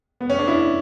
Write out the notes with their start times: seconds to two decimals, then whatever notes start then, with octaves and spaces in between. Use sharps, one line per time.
0.21 B3
0.30 C#4
0.39 D4
0.48 E4